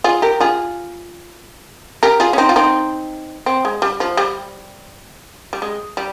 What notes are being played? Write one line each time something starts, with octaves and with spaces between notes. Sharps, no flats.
F4 G#4
G4 A#4
F4 G#4
G4 A#4
F4 G#4
C#4
C4 D#4
F4
C4 D#4
C4
G#3
G3
F3
G3
G3
G#3
G3